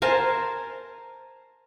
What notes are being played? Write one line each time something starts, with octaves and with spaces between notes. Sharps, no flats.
A#4 C5 G#5 A5